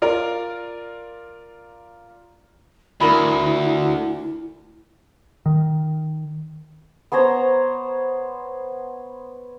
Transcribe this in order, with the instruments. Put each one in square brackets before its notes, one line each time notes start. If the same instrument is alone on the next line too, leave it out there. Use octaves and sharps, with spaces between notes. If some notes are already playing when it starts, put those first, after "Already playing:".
[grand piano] F4 A#4 D5
[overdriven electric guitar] D2 [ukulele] D4 A#4 B5 [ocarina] E4
[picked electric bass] D#3
[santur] B3 C5 C#5 A#5